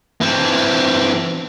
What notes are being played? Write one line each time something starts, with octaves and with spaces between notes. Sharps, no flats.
E3 C4